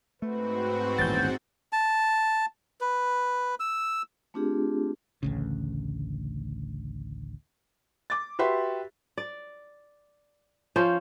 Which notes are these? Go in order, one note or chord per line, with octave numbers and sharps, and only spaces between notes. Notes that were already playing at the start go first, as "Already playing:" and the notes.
G#2 A3 C4 F#4 B4
D#1 A1 G6 A6
A5
B4
E6
A3 C4 D4 F4 G4 G#4
A1 D2 C#3
D6 A6
F#4 G4 B4 E5 C6
D5
F3 C#4 C5